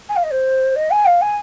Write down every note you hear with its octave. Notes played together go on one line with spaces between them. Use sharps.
G#5
F5
D#5
C5
D#5
G#5
F5
G#5